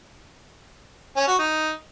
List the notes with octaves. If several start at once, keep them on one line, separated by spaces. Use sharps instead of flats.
C#4
F#4
D#4